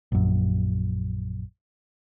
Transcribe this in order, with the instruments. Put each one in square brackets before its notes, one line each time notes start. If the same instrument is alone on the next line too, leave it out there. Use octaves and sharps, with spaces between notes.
[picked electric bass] A#1 F#2